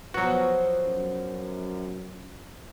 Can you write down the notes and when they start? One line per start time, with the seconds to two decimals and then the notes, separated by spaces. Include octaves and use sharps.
0.14 F3 F#3 B3 F#4
0.86 F#2